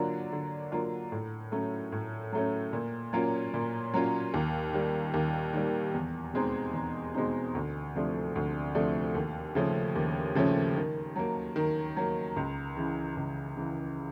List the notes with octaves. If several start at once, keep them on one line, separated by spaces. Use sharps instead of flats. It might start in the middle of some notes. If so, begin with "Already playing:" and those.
Already playing: D3 F#3 A#3 D4 F4
D3
F#3 A#3 D4 F4
A2
F#3 A3 C#4
A2
F#3 A3 C#4
A#2
F#3 A#3 C#4 F4
A#2
F#3 A#3 C#4 F4
D#2
D#3 G3
D#2
D#3 G3
E2
B2 G#3 C4 D#4
E2
B2 G#3 C4 D#4
D2
C3 F3 A3 D4
D2
C3 F3 A3 D4
D#2
C#3 F3 A3 C#4
D#2
C#3 F3 A3 C#4
D#3
F#3 A#3
D#3
F#3 A#3
C#2
C#3 E3
C#2
C#3 E3